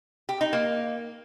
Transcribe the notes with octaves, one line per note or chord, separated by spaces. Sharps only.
G4
D#4
A#3